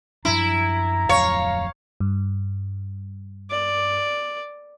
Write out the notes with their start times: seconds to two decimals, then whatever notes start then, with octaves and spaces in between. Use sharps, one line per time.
0.25 F#2 F3 D4 E4 A#5
1.09 D1 F2 F#3 C#5 F5 C#6
2.00 G2
3.50 D5